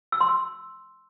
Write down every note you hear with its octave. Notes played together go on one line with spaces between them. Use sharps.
E6
C6
E6